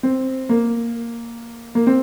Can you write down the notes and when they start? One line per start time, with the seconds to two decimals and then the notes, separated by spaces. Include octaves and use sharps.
0.03 C4
0.49 A#3
1.75 A#3
1.87 C4